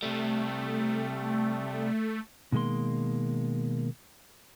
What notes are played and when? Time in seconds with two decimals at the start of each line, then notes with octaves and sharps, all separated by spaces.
0.02 C3 G3 A3
2.52 B2 D#3 G#3 A#3 C6